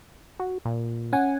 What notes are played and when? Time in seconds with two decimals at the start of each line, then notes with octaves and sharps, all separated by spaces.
0.40 F#4
0.65 A#2
1.13 C#4 F#5 G#5